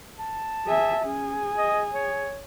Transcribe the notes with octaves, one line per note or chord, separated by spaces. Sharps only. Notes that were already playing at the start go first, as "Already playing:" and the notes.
A5
G#4 E5
C#4 G#4
D#5
C#5